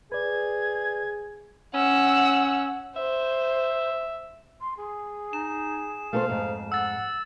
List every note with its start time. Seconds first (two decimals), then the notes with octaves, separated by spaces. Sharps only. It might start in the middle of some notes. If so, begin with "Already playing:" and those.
0.12 G#4 B4 D5 G#6
1.74 C#4 F#5 E6
2.96 C5 E5
4.61 C6
4.77 G#4
5.33 D#4 E7
6.13 A3 A#4 C5 F5
6.29 F2 G#2
6.72 F#5 E6 A6